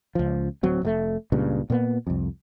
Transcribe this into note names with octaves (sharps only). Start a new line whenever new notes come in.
C#2 F3
D1 F#3 C4
F1 B2 A3
C#2 G2 A#2 C#3
A#2 A#3 B3
C2 F2